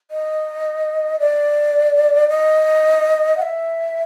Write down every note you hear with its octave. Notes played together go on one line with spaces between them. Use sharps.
D#5
D5
D#5
F#5
E5